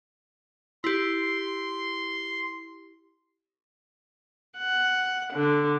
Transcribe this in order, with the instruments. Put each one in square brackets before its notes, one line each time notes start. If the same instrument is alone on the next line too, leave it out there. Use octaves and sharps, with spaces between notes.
[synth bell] E4 G4 [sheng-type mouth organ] C6
[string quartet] F#5
D3